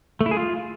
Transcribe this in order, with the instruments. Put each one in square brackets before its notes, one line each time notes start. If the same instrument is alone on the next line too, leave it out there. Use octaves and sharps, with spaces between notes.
[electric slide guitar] A3
E4
G#4
F4